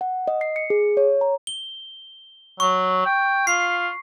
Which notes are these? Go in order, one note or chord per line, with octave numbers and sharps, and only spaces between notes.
F#5
D#5
C7
C#7
G#4
C#5
A#5
G7
F#3 C#6
G5
F4 C7